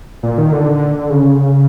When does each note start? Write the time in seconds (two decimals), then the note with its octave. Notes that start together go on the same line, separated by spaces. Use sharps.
0.23 A#2
0.38 D#3
0.52 D3
1.10 C#3